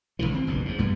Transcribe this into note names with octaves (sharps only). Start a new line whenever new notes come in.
G#1 D#2 D3 E3
C4
F#1 B1 G2
E2 G#2
A#1 G2 G3 B3